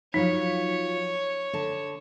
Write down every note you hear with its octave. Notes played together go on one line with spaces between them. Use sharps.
F3 F#3 D#4 F4 C#5
D3 A5